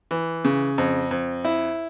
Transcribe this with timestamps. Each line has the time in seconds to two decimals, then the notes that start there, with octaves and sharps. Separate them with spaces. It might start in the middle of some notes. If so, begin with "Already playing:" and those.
0.11 E3
0.45 C#3
0.78 F2
1.11 F2
1.45 E4